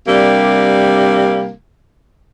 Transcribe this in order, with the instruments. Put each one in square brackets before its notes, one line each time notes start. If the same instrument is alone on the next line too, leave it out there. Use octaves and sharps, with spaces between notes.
[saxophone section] C3 G3 A#3 D4